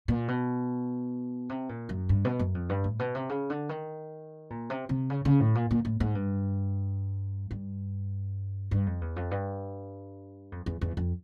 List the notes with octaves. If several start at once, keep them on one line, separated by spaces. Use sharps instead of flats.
A#2
B2
C3
A#2
F#2
G2
B2
F#2
F2
G2
A2
B2
C3
C#3
D3
D#3
A#2
C3
C3
C#3
C#3
A2
A#2
A#2
A2
G#2
G2
G2
G2
F2
E2
F2
G2
F2
E2
E2
F2